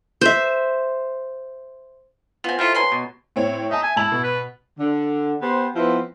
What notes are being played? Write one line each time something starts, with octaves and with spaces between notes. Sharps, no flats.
C5 E5
B3 C4 F4 G#5
C3 D#3 C4 E4 F4 A4
F#3 B4 G#5 C6
B2
A2 C4 C#5
D#4 E5 A5
G#5
G#2 E4 A5 F#7
B2
B4
D3
B3 G4 C5
F3 B3 C4 E4 B4